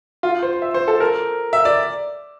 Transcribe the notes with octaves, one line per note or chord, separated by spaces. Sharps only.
F4
C5
E5
C5
A4
A#4
E5
D5